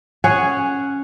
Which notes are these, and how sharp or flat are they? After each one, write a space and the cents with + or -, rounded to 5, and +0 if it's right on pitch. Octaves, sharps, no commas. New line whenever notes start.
C#4 +0 G#4 +0 F#5 +0